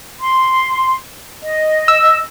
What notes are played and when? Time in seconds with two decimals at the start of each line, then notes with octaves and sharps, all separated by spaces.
0.20 C6
1.43 D#5
1.88 E6